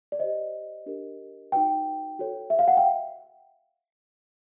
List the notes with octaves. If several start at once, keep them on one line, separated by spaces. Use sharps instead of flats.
D5
G4 C5 D#5
D4 G4 A#4
D#4 F#4 B4 G5
F#4 A4 C#5
E5
F5
F#5
G5